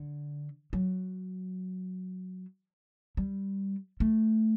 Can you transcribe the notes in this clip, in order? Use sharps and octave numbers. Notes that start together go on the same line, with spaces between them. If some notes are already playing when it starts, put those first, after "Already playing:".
Already playing: D3
F#3
G3
A3